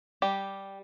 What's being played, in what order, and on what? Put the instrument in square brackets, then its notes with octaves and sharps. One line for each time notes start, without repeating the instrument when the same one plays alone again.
[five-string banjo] G3 G4